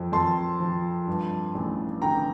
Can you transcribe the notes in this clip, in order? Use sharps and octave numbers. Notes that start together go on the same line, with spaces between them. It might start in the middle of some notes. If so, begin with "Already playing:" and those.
Already playing: F2 F3
F2 A5 C6
F3
G2
A1
D3 G5 A#5